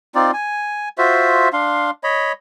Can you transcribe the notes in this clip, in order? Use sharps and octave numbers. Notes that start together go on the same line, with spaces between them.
C4 D#4 F4 D5
G#5
F4 F#4 C5 E5
D4 F5 C6
C#5 D#5 B5